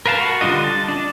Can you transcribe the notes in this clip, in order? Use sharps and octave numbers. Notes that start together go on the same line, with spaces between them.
A#4 B4 F5 A5
F#4
D3 G3 D4 F4 D#5
A5
D4